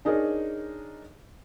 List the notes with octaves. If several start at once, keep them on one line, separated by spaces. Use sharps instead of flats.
D4 D#4 G#4 A#4 C#5